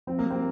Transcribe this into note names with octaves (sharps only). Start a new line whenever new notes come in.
F3 C4
A#3
G2
C4